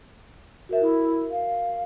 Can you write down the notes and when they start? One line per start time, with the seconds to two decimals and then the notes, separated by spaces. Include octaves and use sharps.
0.69 F#4 A#4 E5
0.81 E4
1.31 F5